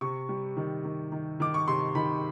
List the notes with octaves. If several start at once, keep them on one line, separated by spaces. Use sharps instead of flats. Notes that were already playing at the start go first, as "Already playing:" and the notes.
C3 C#6
G3
D#3
D#3
D#3
D#3 D6
C#6
C3 C6
D#3 B5